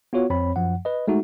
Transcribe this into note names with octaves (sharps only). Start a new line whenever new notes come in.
B3 F4 F#4 C#5
F2 C4 C#5 B5
F#2 F3 F#5
B4 D#5
G#3 A3 D#4 F#4